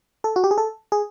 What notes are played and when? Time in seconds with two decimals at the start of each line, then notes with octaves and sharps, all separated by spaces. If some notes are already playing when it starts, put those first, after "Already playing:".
0.24 A4
0.36 F#4
0.44 G4
0.51 G#4
0.58 A4
0.92 G#4